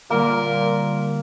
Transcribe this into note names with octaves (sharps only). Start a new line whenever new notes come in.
A#2 D3 G3 A#3 F4 A#4